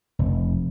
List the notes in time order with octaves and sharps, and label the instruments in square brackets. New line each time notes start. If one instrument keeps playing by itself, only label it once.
[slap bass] F1